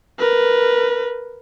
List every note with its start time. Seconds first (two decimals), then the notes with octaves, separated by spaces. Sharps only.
0.19 A#4 B4